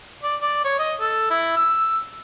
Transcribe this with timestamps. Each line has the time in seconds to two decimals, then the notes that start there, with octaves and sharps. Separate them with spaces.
0.23 D5
0.42 D5
0.64 C#5
0.79 D#5
1.00 A4
1.30 E4
1.57 E6